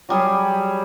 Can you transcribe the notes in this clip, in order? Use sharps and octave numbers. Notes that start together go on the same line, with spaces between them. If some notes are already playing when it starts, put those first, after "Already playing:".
F#3 G3 G#4 C#5